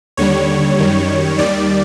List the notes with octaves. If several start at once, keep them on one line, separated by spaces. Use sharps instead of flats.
D#2 D3 G3 C#5
F#2 D#3 G3
D#2 D#3 G3 D5